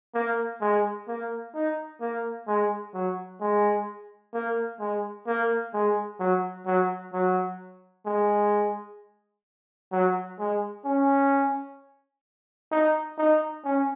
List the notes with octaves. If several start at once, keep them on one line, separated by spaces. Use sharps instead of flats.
A#3
G#3
A#3
D#4
A#3
G#3
F#3
G#3
A#3
G#3
A#3
G#3
F#3
F#3
F#3
G#3
F#3
G#3
C#4
D#4
D#4
C#4